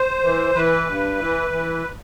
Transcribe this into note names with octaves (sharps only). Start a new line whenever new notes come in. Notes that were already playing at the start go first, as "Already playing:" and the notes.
Already playing: C5
E3
E3 B4
G2
E3
E3